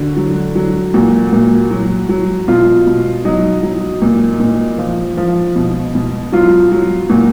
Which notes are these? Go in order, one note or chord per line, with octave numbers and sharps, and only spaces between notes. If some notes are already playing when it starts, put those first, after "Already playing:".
Already playing: D3 F#4
F#3
F#3
A#2 F#4
A#2
F#3
F#3
B2 F4
B2
F#3 D#4
F#3
A#2
A#2
F3
F3
B2
B2
F#3 F4
F#3
A#2 F#4